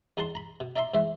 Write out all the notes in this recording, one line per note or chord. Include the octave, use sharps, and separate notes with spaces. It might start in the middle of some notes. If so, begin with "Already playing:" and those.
E2 D#4 G#4 F#5 A5 C6
A#5 B5
B2
D#4 D5 E5 A#5 C6
G#2 E3 C5 E5